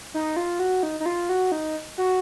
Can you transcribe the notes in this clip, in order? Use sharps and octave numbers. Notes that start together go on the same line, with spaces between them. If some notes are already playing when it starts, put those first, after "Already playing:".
D#4
F4
F#4
D#4
D#4
F4
F#4
D#4
F#4